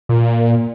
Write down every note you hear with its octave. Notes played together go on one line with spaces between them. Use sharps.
A#2